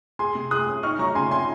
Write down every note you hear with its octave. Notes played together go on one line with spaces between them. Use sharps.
G#4 G#5 C6
C3
G#4 D#6 F#6
C#4
D#4 C#6 F6
F#3 A#5 C#6
C#3 G#5 C6
C4 G#5 C6